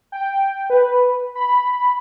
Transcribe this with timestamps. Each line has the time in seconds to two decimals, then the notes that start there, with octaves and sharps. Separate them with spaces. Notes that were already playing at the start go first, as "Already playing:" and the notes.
0.12 G5
0.70 B4
1.35 B5